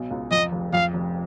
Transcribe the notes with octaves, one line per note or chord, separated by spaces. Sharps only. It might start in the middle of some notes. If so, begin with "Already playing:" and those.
Already playing: B1 B2
C#2
F2 D#5
F1
F2 F5
F1